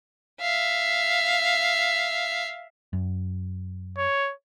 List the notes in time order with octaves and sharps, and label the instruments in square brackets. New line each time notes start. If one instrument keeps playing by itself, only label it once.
[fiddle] E5 F5
[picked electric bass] F#2
[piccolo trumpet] C#5